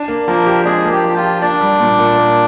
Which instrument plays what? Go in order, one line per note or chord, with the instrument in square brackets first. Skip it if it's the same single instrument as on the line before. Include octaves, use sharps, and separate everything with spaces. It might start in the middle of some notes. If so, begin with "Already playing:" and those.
Already playing: [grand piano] D4
A#3
[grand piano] F3 [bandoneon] A#3 A#4
[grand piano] G4
[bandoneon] G#3 G#4 [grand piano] D4
[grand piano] A#3
[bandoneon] G4
[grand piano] F3
[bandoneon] F4
[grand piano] G4
[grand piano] A#3 [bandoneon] D4 D5
[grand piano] G3
A#2
A#2
A#3